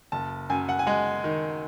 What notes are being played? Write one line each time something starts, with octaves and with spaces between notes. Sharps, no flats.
F#1 A5
F#2 G#5
F#5
G#5
G#3 F#5
D#3